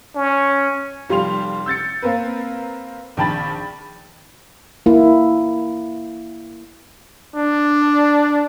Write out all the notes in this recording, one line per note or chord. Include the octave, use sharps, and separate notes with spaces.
C#4
F1 G3 F4 G4 C6 F7
E6 G6 A6 C#7
A#3 C4 A#4 B4
A#1 D#3 G5 A5 B5 A6
A#3 E4
D4